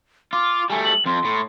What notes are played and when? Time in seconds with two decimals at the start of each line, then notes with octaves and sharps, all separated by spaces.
0.33 F4 D6
0.70 G3 A3 G#5
0.84 F#7
1.06 F2 C6
1.25 A2